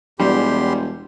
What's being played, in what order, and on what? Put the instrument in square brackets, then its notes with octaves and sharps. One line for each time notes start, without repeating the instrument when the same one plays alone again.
[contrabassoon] E1 [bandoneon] E2 G4 C6 [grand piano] G3